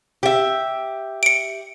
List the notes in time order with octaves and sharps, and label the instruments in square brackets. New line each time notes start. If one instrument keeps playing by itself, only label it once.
[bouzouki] G4 E5
[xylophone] C#7 D7